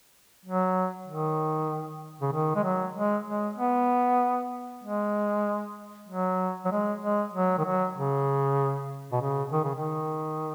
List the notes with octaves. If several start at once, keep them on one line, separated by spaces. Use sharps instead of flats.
F#3
D#3
C#3
D#3
G#3
F#3
G#3
G#3
B3
G#3
F#3
F#3
G#3
G#3
F#3
D#3
F#3
C#3
B2
C#3
D#3
C#3
D#3